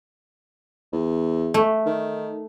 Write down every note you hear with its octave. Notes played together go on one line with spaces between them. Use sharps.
E2
A3
D#3